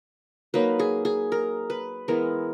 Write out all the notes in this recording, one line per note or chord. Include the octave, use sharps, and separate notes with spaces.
F#3 A#3 D#4 B4
G#4
G#4
A#4
B4
E3 G#3 B3 A#4